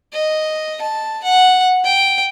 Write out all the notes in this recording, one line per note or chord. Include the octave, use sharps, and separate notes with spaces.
D#5
A5
F#5
G5